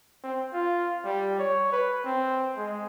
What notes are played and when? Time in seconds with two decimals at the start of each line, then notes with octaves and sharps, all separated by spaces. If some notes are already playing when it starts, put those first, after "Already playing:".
0.24 C4
0.53 F4
1.04 G3
1.39 C#5
1.72 B4
2.05 C4
2.57 G#3